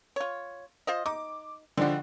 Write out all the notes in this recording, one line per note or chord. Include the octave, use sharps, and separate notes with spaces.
F4 C#5
F4 C5 D#5
D#4 D6
D3 F3 G3 G#3 D4 F#4